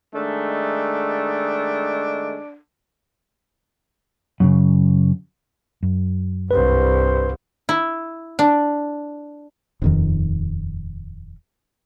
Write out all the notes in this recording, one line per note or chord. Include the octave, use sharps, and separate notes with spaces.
D#3 G#3 A3 D4
F#2 A2 C#3
F#2
C2 G2 B4 C5
E4
D4
D#1 F2 D#3